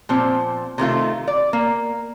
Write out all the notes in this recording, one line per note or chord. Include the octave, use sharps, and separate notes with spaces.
A#2 F3 C4
C3 D#3 A3 F4
D5
A#3